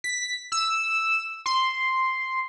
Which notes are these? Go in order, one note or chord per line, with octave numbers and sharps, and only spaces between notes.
B6
E6
C6